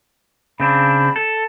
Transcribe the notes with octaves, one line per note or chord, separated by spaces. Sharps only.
C#3 C4 D4 B5
A4